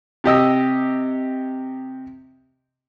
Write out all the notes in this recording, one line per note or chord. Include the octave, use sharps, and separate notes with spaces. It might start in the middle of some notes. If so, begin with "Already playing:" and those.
C3 G4 D#5 E6